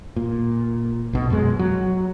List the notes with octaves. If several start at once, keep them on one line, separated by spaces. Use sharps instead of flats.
A#2
B1 B2
F#2 B2 G#3
F#3